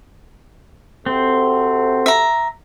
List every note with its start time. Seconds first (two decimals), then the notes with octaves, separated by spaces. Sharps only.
1.06 C3 C4 F#4 A4
2.06 E5 A#5